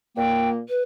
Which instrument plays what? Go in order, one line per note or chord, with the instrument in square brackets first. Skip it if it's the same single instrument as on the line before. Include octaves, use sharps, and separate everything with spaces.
[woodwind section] A#2 A#3 [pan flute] G5
[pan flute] B4